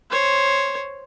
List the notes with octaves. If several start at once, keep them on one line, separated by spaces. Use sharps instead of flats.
C5 C#5